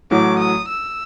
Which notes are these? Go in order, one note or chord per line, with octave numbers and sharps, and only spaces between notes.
A1 A2 F#3 D6
D#6
E6